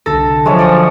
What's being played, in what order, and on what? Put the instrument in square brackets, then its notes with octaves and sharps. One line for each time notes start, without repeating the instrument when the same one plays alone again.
[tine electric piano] C2 D3 A#6 [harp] A4
[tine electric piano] D3 F#3 [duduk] F3 [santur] G#3 C#5 E5
[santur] D5 C#6 D#6